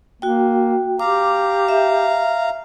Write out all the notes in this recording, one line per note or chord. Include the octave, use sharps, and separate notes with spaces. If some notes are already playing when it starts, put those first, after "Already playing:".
A#3 F#4 G5
G4 F5 A#5 D6
E5